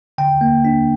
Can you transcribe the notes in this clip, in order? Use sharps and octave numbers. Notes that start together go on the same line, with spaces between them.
D3 G5
A#3
D4